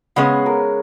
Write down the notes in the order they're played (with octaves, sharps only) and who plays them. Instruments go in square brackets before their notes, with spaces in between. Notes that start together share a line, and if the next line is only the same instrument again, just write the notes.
[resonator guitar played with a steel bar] C#3 G#3 C#4 G#4 [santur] B3
[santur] A#4